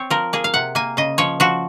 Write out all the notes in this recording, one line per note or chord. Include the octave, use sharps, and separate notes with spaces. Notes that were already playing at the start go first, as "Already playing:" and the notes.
Already playing: C4 C#5
F3 A#4
A#3 G#4
F5
C3 F#5
A#3 G#5
C#3 D#5
F3 C#5
F3 F#4